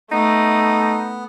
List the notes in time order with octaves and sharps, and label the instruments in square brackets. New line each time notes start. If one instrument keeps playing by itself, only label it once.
[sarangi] A3 [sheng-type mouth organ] B3 [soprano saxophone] D#4